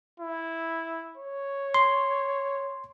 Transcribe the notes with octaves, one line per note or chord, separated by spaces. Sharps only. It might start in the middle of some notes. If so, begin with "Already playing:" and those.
E4
C#5
C6